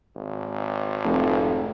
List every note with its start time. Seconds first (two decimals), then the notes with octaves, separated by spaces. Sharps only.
0.16 G#1
1.05 F1